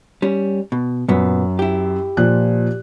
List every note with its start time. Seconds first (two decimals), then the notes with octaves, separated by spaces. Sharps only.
0.22 G3 C#4
0.72 B2
1.09 F#2 A#2 B3
1.59 E4 G4
2.17 A#2 F3 F#6